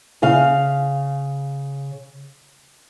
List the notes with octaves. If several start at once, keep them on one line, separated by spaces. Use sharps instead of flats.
C#3 F5